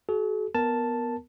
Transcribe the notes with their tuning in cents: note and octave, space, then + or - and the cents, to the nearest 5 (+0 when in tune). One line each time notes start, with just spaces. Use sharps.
F#4 +30 A4 -45
B3 +0 A#4 +0 A5 +0